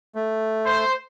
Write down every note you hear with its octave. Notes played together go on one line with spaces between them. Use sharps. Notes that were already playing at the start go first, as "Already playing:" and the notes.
A3
C5